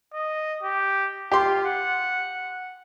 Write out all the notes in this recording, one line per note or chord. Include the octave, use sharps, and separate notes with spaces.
D#5
G4
F4 G4 C6
F#5